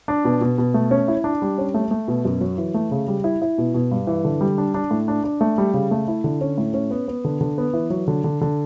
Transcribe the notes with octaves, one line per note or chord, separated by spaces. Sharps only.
D4
B2
B2
B2
A3
C#4
E4
D4
G3
C#4
A3
A3
B2
F#2
F#3
E3
A3
C#3
G3
E4
E4
B2
B2
G2
E3
D3
G3
D4
D4
A2
D4
D4
A3
G3
C#3
A3
E4
D3
C#4
A2
C#4
B3
B3
D3
D3
B3
E3
F#3
D3
D3
D3